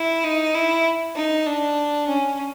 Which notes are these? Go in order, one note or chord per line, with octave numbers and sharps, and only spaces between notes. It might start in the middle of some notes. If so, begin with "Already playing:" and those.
Already playing: E4
D#4
E4
D#4
D4
C#4